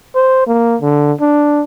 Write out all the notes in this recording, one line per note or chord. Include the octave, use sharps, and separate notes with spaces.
C5
A#3
D3
D4